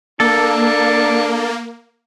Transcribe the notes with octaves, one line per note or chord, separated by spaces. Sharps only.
A#3 D4 A4